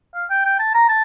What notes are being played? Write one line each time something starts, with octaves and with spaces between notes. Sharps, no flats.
F5
G5
G5
A5
A#5
A5